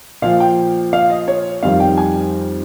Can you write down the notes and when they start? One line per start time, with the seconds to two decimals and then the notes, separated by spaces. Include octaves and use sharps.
0.22 A#2 F3 F5
0.40 G5
0.93 F5
1.10 D#5
1.28 C#5
1.63 F2 D#3 G3 F5
1.80 G5
1.97 G#5